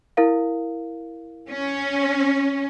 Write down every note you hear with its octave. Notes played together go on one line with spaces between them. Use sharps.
E4 A#4 F5
C#4